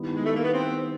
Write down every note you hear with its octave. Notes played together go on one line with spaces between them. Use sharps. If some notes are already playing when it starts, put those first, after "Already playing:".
Already playing: D#3 G3 B3 E4
G#3
A3
A#3
B3
C4